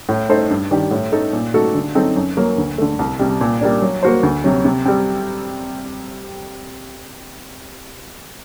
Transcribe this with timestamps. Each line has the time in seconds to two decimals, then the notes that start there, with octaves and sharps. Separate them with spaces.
0.09 A2
0.30 A3 D#4 A4 C5
0.50 G2
0.71 D#3 G3 D4 G4
0.91 A2
1.12 A3 D#4 A4
1.33 A#2
1.54 A3 D#4 F#4 A4
1.74 D3
1.95 F#3 C4 D#4 A4
2.16 F#2
2.37 F#3 A#3
2.58 D2
2.78 D3 A3
2.99 C2
3.19 C3 G3
3.41 A#2
3.61 G3 A#3 D4
3.82 F#3
4.03 A#3 F#4 C5
4.23 D2
4.44 C3 F#3
4.65 C3
4.85 G3 C4